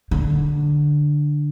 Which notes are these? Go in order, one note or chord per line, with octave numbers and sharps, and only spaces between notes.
D3